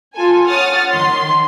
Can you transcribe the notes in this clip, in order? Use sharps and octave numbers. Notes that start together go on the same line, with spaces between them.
F4 A4 G#5
C#5 F#5 D#6 F6 A6
D#3 C6